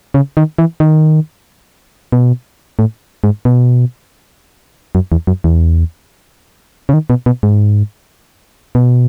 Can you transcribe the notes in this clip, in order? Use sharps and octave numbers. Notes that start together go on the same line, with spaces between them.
C#3
D#3
E3
D#3
B2
A2
G#2
B2
F#2
E2
F#2
E2
C#3
D#3
B2
B2
G#2
B2